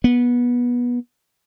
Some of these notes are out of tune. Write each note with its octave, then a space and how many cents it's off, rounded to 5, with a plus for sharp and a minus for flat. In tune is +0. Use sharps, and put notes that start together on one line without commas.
B3 -20